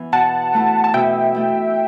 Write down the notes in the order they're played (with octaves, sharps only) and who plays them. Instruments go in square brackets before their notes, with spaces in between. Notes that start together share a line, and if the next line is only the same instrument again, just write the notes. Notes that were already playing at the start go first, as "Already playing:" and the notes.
Already playing: [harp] E3 B3
[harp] B2 [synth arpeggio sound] F#5 A5
[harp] A3 E4
[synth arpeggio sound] A5
[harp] B2 [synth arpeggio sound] E5 G5
[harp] A3 E4